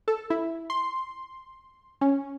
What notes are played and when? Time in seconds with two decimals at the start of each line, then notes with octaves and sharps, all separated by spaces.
0.08 A4
0.30 E4
0.70 C6
2.01 C#4